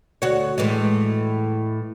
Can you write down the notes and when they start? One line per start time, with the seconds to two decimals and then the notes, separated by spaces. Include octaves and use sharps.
0.22 D2 F#4 C#5
0.58 A2 E3 G#3